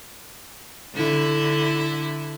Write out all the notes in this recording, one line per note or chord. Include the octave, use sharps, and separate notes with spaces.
D3 E4